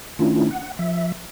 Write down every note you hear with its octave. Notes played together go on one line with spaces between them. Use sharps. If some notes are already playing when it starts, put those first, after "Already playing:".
D#3 A3 C#4 D4 E4 F4
F#5
F3 E5